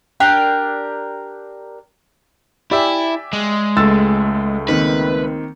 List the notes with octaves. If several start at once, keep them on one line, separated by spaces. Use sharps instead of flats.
D4 G4 A#4 G5
E4 G4 D5 E5 G5 G#5
G#3
C#2 A3 C6 E6 A6
D#3 A#3 C4 B4